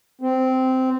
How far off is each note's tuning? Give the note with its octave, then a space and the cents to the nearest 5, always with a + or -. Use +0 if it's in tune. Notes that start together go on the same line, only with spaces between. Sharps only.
C4 -10